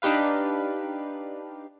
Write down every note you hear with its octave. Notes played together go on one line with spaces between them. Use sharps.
D4 D#4 G4 B4 F5